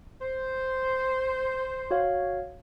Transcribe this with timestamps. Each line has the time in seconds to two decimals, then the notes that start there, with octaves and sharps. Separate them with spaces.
0.21 C5
1.91 F#4 C#5 F5